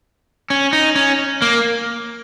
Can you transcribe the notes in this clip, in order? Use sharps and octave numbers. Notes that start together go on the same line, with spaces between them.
C#4
D#4
C#4
A#3